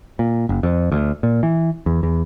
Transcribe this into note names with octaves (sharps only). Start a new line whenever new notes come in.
A#2
F#1
F2
D2
A#2
E3
E2
E2